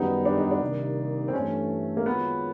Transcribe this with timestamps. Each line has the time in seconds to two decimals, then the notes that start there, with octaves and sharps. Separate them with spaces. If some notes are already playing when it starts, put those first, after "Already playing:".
Already playing: F#2 D#3 G3 B3 D#4
0.25 D4
0.37 D#4
0.51 D4
0.61 C3 D#3 G3 A#3 D#4
1.28 C4
1.33 G2 E3 A3 C#4
1.97 A#3
2.06 F#2 D#3 G#3 B3 C#4 F4